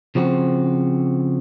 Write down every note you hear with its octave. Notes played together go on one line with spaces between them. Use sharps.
C#3 F3 C4 F#4